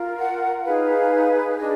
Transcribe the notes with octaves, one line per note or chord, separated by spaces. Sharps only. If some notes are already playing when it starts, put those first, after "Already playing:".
Already playing: F4 A#4
F#5
D#4 G#4 B4 F5
D4 G#4 D#5